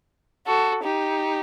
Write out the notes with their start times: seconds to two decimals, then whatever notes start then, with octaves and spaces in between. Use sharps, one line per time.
0.45 F#4 A4
0.82 D#4 G4